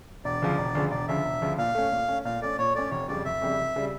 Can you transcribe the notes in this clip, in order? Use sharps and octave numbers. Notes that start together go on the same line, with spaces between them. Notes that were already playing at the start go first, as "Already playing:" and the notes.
E1 D5
D2 C#3 F3
E1
D2 C#3 F3
E1 D5
D2 C#3 F3 E5
E1
D2 C#3 F3
A#2 F5
A3 C#4
A#2
A3 C#4
A#2 F5
A3 C#4 D5
A#2 C#5
A3 C#4 D5
F1 C#5
F2 C#3 G3 D5
F1 E5
F2 C#3 G3
F1
C#3 G3